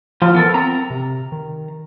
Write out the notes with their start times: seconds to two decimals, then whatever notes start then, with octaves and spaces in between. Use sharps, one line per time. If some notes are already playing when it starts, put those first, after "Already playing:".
0.22 F3 F4
0.35 E3 B3 A4 A#4
0.54 C4 A#5
0.90 C3
1.32 D#3